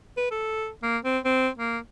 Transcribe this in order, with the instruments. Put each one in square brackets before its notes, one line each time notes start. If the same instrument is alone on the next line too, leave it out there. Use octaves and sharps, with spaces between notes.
[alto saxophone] B4
A4
A#3
C4
C4
A#3